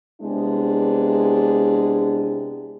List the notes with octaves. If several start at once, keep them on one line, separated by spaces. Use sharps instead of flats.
C3 G#3 B3 D4 E4 G#4